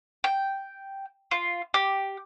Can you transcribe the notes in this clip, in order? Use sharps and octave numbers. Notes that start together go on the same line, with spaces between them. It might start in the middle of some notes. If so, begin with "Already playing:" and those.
G5
F4
G4